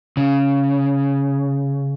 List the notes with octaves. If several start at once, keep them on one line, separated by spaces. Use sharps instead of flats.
C#3